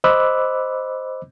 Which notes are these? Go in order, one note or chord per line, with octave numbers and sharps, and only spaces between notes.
C5 D#5 B5 D6 E6 F#6